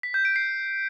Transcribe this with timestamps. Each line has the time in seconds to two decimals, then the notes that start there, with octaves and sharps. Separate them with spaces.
0.03 B6
0.14 G6
0.25 D7
0.36 C7